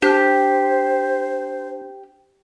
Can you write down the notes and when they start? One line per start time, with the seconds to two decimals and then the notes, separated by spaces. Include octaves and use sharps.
0.02 D4 G4 C5